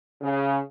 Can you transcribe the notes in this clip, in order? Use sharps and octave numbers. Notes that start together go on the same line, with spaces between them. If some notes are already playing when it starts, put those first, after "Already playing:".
C#3